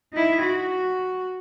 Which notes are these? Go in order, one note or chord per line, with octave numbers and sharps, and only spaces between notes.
D#4 E4
F#4